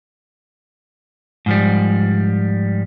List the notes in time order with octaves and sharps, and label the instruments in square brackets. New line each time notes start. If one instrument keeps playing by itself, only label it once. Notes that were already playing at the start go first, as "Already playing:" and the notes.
[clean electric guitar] G#2 F3 G3